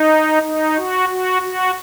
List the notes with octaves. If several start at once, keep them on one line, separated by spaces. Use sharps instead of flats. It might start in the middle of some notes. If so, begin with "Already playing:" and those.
Already playing: D#4
D#4
F#4
F#4
F#4